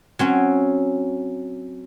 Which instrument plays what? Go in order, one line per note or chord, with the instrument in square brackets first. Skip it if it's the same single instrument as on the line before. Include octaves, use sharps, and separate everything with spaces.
[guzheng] F#3 C4 C#4